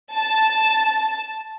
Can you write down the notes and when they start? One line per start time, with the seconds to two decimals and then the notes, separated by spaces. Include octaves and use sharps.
0.13 A5